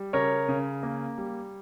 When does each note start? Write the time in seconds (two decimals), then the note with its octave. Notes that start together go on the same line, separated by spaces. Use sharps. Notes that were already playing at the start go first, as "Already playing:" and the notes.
Already playing: G3
0.13 C#3 A#4 C#5
0.48 C#3
0.83 A#3
1.17 G3